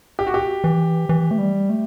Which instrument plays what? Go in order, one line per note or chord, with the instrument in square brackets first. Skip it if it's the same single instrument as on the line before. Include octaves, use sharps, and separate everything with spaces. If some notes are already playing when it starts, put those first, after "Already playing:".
[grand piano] G4
F#4
G4
[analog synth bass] E3
E3
A3
G3
A3